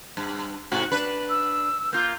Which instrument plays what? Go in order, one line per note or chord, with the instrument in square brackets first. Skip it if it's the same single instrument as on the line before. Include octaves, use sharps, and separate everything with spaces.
[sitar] G2
G#2 C3 F#4
D4 B4
[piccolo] E6
[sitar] A#3 F4 [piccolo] G6